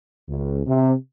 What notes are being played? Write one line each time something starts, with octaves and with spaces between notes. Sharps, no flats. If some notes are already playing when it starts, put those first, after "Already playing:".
C#2
C3